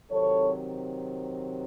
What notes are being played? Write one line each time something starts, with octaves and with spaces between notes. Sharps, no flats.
C3 D#3 F#3 C4 A4 C#5